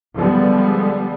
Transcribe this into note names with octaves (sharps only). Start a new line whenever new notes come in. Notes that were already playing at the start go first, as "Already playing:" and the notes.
D3 F3 G3 G#3 B3